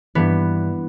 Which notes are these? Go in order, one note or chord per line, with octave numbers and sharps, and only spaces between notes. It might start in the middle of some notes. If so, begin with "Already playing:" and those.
G2 E3 B3